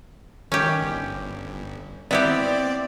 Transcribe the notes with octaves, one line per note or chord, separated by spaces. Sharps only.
D#3 C#4 G4
G1
B3 C4 E4 G4 D5